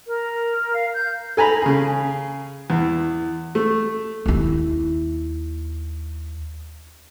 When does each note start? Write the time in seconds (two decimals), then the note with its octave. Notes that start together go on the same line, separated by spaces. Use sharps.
0.07 A#4
0.73 F5
0.94 G6
1.37 A4 G#5 A#5 B5
1.62 C#3 G#4
2.70 E2
3.55 A3
4.26 D#2 E4